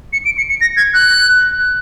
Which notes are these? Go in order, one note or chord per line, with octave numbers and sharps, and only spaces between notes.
C#7
D7
C#7
C#7
A#6
G#6
F#6